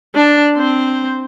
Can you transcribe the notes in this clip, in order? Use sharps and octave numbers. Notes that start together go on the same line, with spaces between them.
D4 A5
C4 C5